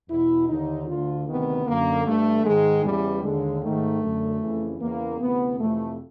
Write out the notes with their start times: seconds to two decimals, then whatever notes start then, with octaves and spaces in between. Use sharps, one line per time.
0.08 E2 B2 E4
0.48 D#2 D3 D#4
0.87 D2 D3 F4
1.27 D2 C3 D#3 B3
1.66 F#2 D3 A#3
2.05 G2 D3 A3
2.44 G#2 D#3 G#3
2.83 E2 C#3 E3 G3
3.22 D#2 D3 G#3
3.62 G#2 D#3 A3
4.01 F#2 D3
4.41 F2 C#3 E3
4.79 E2 C#3 E3 A#3
5.19 D2 C3 E3 B3
5.58 F2 C3 E3 A3